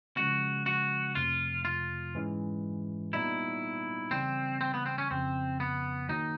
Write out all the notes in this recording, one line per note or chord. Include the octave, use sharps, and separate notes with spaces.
C#3 F3 G#3 C#4 F#4
F#4
F2 C3 F3 A3 F4
F4
G#2 E3 G#3 C#4
A#2 G3 B3 D#4 E4
C#3 E3 G3 C4
C4
B3
C4
C#4
F2 C#3 F3 C4
B3
D#3 F#3 A#3 D#4